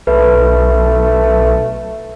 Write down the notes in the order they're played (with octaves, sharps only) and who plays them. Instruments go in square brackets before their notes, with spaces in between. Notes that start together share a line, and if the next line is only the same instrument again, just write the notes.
[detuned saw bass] B1 [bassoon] A3 [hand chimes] B4